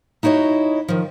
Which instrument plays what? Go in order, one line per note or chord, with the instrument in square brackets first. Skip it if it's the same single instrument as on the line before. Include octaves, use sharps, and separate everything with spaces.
[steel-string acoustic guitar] D#4 E4 F#4 C#5 D#5
D#3 F3